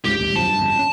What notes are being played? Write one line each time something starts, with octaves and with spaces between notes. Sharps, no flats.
C#2 G#2 C#3 G4
D#1 A1 D#2
F#2 C3 F3 A5
G2
G1 F2 C#3
F#3 C#4